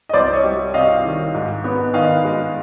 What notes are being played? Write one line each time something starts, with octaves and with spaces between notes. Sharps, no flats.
D#5
C2 C5 D5
C#5 D#5
G3
C3 D#5 F5
D#3
G#2
B3
D#3 D#5 F5
G#3